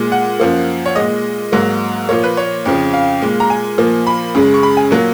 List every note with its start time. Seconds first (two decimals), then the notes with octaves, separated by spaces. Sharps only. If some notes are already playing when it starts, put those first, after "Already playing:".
Already playing: A#2 G#3
0.12 F#5
0.40 F#2 F3 A#3
0.86 C#5
0.96 A#2 G#3 D#5
1.52 G#2 F#3 A#3
2.09 A#2 F3 A#3 C#5
2.24 B4
2.37 C#5
2.66 F2 C#3 F3
2.93 F5
3.22 A#2 G#3
3.40 A#5
3.50 G#5
3.78 A#2 F3 A#3
4.07 B5
4.35 F#2 C#3 G#3
4.54 C#6
4.63 B5
4.77 G#5
4.91 A#2 F#3 A#3